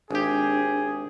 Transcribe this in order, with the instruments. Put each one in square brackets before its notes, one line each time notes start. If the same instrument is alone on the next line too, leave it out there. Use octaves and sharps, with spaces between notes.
[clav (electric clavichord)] G#1 G4 [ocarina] D4 [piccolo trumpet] G#4